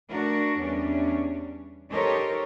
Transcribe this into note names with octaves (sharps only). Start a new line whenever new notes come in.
A3 D4 F#4 A#4
E2 G3 C#4 D4
D#4 G4 A4 A#4 C5 C#5